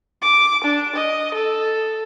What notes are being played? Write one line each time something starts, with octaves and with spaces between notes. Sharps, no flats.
D6
D4
D#5
A4